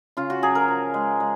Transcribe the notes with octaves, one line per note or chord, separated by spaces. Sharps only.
C#3 F4
F#4
F#3 G#4
A#4
F3
G#3
G#3